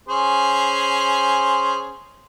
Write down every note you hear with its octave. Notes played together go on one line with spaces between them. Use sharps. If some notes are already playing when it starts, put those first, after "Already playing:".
C#4 G#4 C5